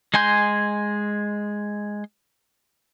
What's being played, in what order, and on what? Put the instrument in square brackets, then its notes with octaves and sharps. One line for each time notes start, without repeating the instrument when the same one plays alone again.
[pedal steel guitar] G#3 D#5 G#5 C6 G6